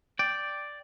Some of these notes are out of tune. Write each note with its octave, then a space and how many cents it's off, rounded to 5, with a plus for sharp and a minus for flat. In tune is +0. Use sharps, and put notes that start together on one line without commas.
D5 +0 G5 +0